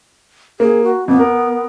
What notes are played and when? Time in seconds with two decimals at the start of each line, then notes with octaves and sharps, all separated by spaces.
0.60 A#3 G#4
0.84 F#4
1.08 F2 B3
1.19 A#4